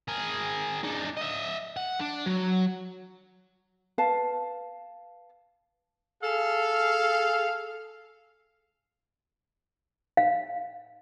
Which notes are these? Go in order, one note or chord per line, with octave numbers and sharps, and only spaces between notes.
G#4 A#4
D4 D#4
D#5 E5
F#5
D4
F#3
B4 F5 A5
G#4 A4 F5
F5